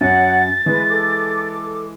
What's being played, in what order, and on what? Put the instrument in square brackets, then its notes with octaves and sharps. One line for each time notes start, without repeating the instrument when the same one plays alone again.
[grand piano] F#2 [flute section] C#5 F#5 [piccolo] A6
[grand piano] E3 G#3 [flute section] B4
[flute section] A4 D6